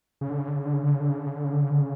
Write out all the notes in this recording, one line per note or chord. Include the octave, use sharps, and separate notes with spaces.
C#3
D3
C#3
D3
C#3
D3
C#3
D3
C#3
D3
C#3
D3
C#3
D3
C#3
D3
C#3
D3
C#3